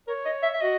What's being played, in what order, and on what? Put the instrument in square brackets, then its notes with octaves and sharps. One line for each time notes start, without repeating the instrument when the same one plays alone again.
[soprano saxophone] A#4 [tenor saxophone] C#5
[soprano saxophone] D#5
E5
E5
[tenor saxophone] F#4 [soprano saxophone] D#5